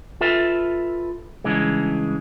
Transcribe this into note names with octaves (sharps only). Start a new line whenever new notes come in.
F4 A4 B4 E5
G2 C#3 E3 G#3